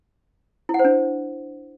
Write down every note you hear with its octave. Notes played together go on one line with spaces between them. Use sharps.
E4
F#5
C5
D4